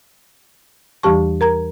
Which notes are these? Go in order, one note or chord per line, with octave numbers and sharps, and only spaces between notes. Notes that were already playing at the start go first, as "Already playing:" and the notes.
E2 E3 G3 G4 A5 C#6
A#4 A#5 G#6